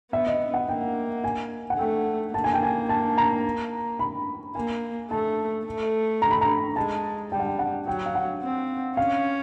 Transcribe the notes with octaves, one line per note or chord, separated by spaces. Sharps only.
B3 E5
D#5
F#5
A#3 G5
G#5
F#5
A3 G5
A#3 A5
G#5
G5
G#5
A5
A#5
B5
A#3 G#5
A3 A5
A3
A#5
B5
A#5
G#3 A5
G3 G5
F#5
G5
F#5
F#3 G5
F5
F#5
C4
C#4 F5